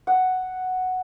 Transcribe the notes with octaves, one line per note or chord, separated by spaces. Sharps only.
F#5